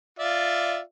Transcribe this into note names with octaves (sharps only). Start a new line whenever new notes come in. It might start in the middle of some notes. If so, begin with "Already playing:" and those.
F4 D5 E5